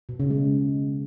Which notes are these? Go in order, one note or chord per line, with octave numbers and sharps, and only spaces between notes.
B2
C#3
G#3